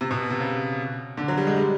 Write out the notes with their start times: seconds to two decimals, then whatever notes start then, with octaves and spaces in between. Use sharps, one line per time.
0.01 C3
0.11 B2
0.30 C3
0.40 C#3
1.17 D3
1.28 F#3
1.38 G3
1.47 G#3
1.57 G3